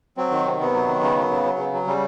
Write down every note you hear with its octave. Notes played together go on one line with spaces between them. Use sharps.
F#3 C4
D#3
C3
C3 B3
F#3
D#3
C#3
F#3
C#3
F#3
C#3
F#3
C#3 G3